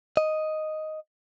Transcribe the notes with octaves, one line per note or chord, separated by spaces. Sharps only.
D#5